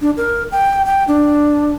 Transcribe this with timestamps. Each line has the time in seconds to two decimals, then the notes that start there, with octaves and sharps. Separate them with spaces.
0.01 D4
0.17 A#4
0.52 G5
0.86 G5
1.08 D4